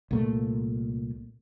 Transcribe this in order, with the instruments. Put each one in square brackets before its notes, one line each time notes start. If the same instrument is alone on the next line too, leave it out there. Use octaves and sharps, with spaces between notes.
[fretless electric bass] C2 A#2 A3